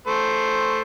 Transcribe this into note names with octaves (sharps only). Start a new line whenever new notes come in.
A3 C5